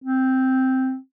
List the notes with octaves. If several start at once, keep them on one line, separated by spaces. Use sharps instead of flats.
C4